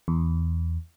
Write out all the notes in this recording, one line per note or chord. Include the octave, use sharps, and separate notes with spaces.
E2